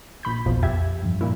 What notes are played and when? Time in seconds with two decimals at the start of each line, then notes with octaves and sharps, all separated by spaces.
0.23 A#1 B5 G6
0.46 A#1 E2 B2 F3 C4
0.63 F2 G4 E5 G#6
1.03 G2 F3
1.21 A#2 A#3 E4